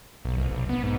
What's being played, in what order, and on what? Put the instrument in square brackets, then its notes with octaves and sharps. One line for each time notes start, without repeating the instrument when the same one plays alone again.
[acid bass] B1
C2
B1
B3
G#2